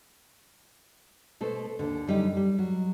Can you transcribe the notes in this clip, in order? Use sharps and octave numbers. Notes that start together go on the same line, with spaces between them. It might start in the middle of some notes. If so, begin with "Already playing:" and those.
B2 A3 A4 C5
D#2 D3
F#2 G3 D#4 G4
G3
F#3